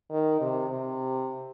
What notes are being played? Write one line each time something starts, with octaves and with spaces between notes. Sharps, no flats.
D#3
C3
C3